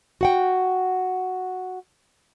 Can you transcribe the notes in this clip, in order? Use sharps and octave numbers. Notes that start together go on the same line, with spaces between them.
F#4 F#5 G5